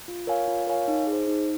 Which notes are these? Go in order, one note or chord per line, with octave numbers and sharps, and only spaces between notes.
F4
A#4 C#5 F5 G#5
F4
A#4 C#5 F5 G#5
D#4
G#4
C5
D#4